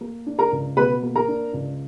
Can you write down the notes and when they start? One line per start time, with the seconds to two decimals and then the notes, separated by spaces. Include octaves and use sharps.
0.01 A#3
0.26 D4
0.39 A#4 A#5
0.52 C#2
0.77 B2 B4 B5
1.02 A#3
1.16 A#4 A#5
1.28 D4
1.53 C#2